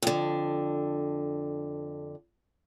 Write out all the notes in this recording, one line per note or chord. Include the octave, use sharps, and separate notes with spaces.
F2 D3